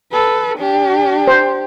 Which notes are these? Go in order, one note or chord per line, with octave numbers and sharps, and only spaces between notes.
A4 B4
D4 G4
C5